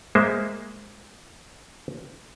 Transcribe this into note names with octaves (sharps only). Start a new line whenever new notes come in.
G#3 A#3 C5 E5